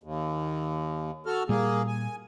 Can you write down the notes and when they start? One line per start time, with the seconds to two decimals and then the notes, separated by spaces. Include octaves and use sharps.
0.04 D#2
1.26 F#4 A4 F6
1.49 A#2 G3 A#3 G#4
1.87 G#5